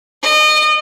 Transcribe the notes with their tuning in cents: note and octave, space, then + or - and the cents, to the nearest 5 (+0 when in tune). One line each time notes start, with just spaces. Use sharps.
D#5 -30